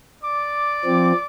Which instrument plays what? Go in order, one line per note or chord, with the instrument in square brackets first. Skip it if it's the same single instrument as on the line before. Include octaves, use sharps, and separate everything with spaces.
[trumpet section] D5 D6
[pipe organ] F3 C4